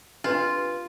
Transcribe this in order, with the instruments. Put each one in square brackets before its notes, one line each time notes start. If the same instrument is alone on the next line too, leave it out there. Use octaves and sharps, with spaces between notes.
[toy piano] D4 G4 B4 [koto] F4